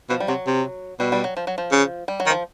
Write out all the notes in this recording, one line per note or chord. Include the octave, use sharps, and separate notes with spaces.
B2 F3
G3
C3 F#3
C3
B2 G3
G3
F#3
F3
F#3
F3
C#3
G3
F#3
D#3
F3